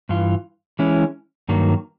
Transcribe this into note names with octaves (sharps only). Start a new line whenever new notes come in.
G2 E3 F4
E3 G#3 C#4 E4
G2 D#3 F#3 A#3